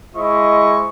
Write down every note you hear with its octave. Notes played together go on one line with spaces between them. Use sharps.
G#3 E4 C5 D#5 C#6